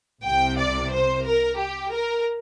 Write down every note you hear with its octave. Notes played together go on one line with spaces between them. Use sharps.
C2 C3 G5
D5
C5
A#4
G4
A#4